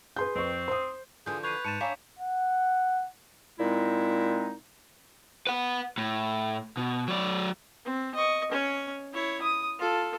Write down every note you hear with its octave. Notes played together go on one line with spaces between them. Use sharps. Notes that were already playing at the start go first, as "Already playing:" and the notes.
G#4 B4 C6 G6
F2 C4 C#6
C5 C6 D#6
D3 E3 F3 G#4 G6
B4 C#6 G6 G#6 C7 D#7 F7
G#2 A5 B5 A6 C#7 D#7 E7
D4 C#5 E5 F5 G#5 A#5 C#6 B6
F#5
A#2 G#3 C4 D#4 E4
B4 F#5
A2
B2
F#3 D5
C4
D#5 C#6
C#4 C#5
E4 C#5
D#6
F4 A4